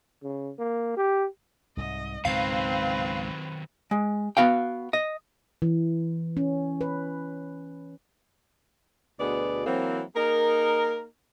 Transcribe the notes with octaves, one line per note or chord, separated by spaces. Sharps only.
C#3
A#3
G4
C2 G#2 D#5
C#2 G#2 B2 D#3 F#3 C4 B4 F5
G#3
B3 F#4 F5 G5
D#5
E3
C#4
B4
D2 B2 B3 G#4 D5
E3 F#3 A#3 C4
A#3 D#4 G#4 A#4